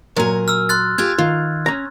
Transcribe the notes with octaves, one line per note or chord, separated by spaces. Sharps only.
A#2 F#3 A#4 G#5
E6 F6
C6 F#6 A6
F4 G4 G#4 G#6
D#3 F4
C#4 A#5